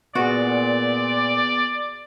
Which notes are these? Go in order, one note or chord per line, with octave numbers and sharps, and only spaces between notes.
A#2 B3 F#4 G#4 D5